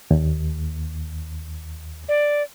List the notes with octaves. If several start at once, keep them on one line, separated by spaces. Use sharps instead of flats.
D#2
D5